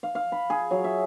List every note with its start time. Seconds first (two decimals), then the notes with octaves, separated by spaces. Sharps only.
0.03 F5
0.15 F5
0.32 B5
0.50 G#4
0.71 F#3
0.84 E5